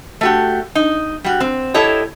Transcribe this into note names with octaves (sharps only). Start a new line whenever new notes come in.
A3 F#4 G4
D#4
G3 F#4
C4
E4 G4 A4 C#5 D#5